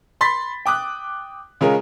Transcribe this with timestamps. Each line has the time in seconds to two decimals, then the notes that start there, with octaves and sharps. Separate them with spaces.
0.21 B5 C6 A6 B6
0.66 G5 D6 D#6 F#6
1.61 C#3 G#3 C#4 F4 G#4 A#4